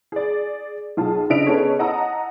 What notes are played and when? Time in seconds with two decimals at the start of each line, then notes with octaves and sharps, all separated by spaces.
0.12 G#4 D5
0.97 B1 F4 G#4 A5
1.30 C#3 D4 D#5 E5 D7 F7
1.47 B3 C#4 D#4 G#4 A4 C#5
1.79 D#5 F#5 A5 A#5 D#6 E6